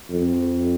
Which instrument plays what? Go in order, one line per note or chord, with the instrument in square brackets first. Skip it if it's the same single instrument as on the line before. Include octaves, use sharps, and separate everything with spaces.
[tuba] F2